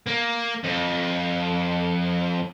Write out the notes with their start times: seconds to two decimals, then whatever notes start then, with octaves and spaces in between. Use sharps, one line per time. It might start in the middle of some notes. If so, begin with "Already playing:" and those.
0.06 A#3
0.63 F2